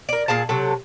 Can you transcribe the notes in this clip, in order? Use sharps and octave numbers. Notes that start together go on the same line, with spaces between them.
A#4 D5
A#2 G#4 F5 A5
C3 F#3 A4